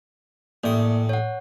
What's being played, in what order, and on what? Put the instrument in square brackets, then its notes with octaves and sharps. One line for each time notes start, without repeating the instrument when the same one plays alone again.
[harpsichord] A1 A2 D#6 [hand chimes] A#3 D5
[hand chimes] C#5 F#5